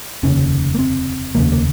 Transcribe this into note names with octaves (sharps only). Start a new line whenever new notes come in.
F1 D#2 C#3 C#4
A#3
C4
F1 D#2 C#3 A#3
A#3